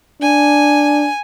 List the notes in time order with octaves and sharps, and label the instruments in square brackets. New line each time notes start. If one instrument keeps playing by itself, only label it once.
[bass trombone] D4 [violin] G#5